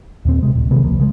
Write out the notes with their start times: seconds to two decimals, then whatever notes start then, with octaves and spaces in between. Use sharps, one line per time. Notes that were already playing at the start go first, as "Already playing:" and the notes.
0.25 D#2 A#2 C4
0.42 C3 G#3
0.55 D1 A#1
0.71 C3 D#3 E3 G#3
0.84 D1 C2 F3 A#3
0.98 C2 C#3 G#3